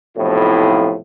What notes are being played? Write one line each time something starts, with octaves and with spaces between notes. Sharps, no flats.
B1 F2 A2 C3 F3 E4